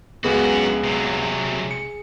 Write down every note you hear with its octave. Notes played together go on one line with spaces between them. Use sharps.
C#2 F#2 B3 F#4 G#4
C3 F#3
C#7